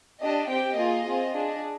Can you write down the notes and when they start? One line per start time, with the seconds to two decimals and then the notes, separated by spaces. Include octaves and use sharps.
0.21 D4 G4 D#5
0.49 C4 G4 G5
0.77 A#3 F4 G#4 D#5
1.06 C4 F4 G#4
1.34 D4 G#4